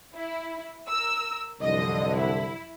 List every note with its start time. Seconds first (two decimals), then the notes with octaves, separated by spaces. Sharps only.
0.15 E4
0.88 A#4 E6
1.62 C2 F#2 D3 F3 D#5
2.16 E4